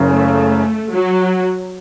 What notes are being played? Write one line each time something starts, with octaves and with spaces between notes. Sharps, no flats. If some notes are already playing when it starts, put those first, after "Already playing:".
Already playing: F#1 F#2 C#3
A3
F#3